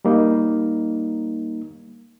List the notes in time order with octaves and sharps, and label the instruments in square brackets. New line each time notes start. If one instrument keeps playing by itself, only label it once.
[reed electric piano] G3 A#3 D#4